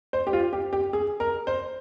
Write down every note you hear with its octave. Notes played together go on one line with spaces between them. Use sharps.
C5
G4
F4
G4
G4
G#4
A#4
C5